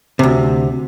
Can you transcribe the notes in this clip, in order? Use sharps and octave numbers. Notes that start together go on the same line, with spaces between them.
D2 C3